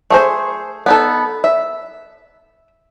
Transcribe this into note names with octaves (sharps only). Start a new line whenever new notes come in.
A3 G#4 C5
B3 D#4 A4
E5